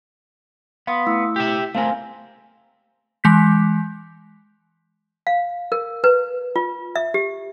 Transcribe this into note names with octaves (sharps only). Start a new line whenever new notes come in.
B3 F5 C6 D#6
A3 E4 E6
G4 E5
A3 C4 A#4 F5 G#5
E3 G#3 G6 B6
F5
A#4
B4
F4
E5
G4